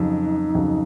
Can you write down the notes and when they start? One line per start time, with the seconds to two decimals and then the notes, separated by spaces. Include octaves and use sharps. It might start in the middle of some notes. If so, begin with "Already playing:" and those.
Already playing: F2 C#3 F#3 D#4
0.55 F2 C#3 F#3